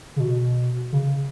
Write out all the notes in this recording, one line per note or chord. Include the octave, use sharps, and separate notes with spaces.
C#3
B2
C#3